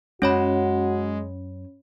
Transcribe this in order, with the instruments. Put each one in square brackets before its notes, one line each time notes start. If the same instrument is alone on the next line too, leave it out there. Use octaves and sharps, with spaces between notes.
[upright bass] F#2 [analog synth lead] G#3 [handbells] C#4 C#5 B5 [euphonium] F#4